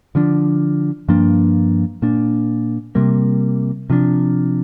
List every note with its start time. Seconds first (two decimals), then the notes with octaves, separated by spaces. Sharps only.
0.15 D3 F3 D4
1.09 G2 F3 A#3 D4
2.02 A#2 A#3 D4
2.95 C3 G3 A#3
3.90 C3 F3 D4